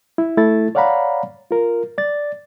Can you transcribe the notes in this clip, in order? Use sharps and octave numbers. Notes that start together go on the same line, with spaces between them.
E4
A3 E4 A4 A6
C#5 D5 F5 F#5 A#5 B5
F4 A#4
D5 A6